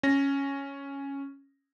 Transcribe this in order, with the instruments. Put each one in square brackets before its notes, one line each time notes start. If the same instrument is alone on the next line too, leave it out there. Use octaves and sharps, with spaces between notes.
[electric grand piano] C#4 A#6